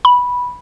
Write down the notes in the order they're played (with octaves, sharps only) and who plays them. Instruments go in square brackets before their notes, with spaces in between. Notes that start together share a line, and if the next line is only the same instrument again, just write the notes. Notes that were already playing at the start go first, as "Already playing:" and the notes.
[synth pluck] B5